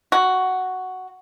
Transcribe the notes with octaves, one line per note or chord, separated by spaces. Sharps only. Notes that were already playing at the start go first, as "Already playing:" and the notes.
F#4